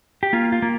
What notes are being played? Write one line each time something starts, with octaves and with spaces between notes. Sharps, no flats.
G4
A#3 F4
F4
A#3